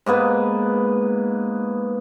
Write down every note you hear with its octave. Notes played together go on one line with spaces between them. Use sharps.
G#2 A#3 B3 B4